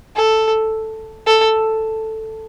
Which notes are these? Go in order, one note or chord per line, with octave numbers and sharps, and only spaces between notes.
A4
A4